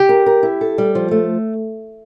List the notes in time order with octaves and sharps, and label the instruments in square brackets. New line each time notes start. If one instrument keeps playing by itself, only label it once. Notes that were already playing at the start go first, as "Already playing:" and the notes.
Already playing: [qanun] G4
[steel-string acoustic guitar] A#4
A#4
E4
A4
G3
F3
A3